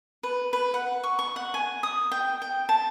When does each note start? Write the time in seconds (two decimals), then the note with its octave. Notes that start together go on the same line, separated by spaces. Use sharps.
0.23 B4
0.53 B4
0.74 F#5
1.04 C#6
1.19 C#6
1.36 F#5
1.54 G#5
1.83 D#6
2.11 G5
2.42 G5
2.69 A5